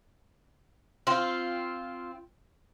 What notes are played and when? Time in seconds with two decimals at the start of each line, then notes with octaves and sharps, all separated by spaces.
1.07 C4 F4